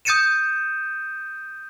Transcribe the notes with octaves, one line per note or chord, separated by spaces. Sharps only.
D#6 G6 A6 C#7 D#7 E7